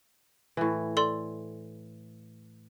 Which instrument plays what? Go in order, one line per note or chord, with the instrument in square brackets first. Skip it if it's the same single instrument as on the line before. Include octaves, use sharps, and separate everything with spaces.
[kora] A2 E3
[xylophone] A4 D5 C6